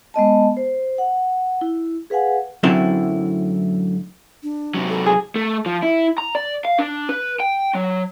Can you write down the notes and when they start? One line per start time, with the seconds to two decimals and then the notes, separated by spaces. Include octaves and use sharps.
0.14 G#3 B3 D#5 A5
0.57 C5
0.98 F#5
1.61 E4
2.10 G#4 B4 F5 F#5 G#5
2.63 F#2 A2 D3 F#3 C4 E4
4.43 D4
4.74 C3 F#3
4.89 A4
5.06 G#4
5.36 A3
5.66 F3
5.83 E4
6.18 A#5
6.35 D5
6.65 F5
6.79 D4
7.09 B4
7.40 G5
7.75 F#3